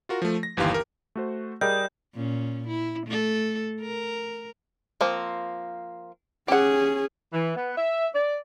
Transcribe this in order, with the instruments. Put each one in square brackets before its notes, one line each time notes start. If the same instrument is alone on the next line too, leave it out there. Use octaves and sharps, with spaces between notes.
[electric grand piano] F4 F#4 A#4
F3 A3
A#6
G1 D#2 E3 G4 F5 C6
G4 A#4
A3 F#4 C5
[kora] G3 [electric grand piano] G#4 A#4 D#5 [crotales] G6
[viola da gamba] A#2 C#4
E4
A3 A4
A#4
[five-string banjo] F3 A#3 C4
[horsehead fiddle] C#4 G#4 [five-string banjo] G4 F#5
[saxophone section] E3
B3
E5
D5